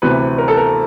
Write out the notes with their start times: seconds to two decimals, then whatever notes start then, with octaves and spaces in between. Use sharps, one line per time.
0.02 D2 C3 E3 B4
0.38 A#4
0.48 A4
0.57 A#4